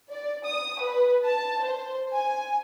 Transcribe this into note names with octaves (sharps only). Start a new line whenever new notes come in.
D5
D#6
B4
A5
C5
G#5